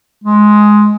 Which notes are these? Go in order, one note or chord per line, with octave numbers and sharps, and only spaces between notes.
G#3